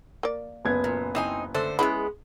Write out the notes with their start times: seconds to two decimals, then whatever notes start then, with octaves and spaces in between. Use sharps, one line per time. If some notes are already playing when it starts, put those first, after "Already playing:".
0.23 A#3 D5
0.65 F#1 B3 G#6
0.84 A#2
1.15 E3 C4 D#4 G#5
1.55 D3 A3 A4 C5
1.79 G#3 B3 C#4 E4 B5